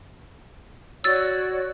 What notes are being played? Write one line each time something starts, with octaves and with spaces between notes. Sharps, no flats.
F#4 C#5 D5 E6 A6